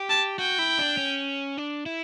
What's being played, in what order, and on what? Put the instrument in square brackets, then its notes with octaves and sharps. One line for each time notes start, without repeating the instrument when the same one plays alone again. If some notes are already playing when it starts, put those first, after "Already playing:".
Already playing: [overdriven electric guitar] G4
[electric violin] A5
[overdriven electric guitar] F#4 [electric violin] G5
[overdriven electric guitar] E4
D4
C#4
D4
E4